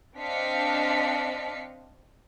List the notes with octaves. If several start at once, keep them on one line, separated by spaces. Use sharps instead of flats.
C4 D4 D#5 F5 B6 C#7